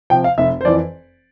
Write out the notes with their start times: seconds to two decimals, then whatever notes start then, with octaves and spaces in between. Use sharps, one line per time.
0.10 C3 F3 G5
0.24 F5
0.38 F1 E5
0.61 C5
0.65 F2 E3 D5